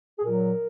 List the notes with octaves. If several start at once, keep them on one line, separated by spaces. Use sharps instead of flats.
G#4
A#2 F#3 A#4